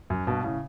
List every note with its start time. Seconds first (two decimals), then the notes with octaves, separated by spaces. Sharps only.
0.10 F#2
0.27 G2 B2
0.44 A2 C#3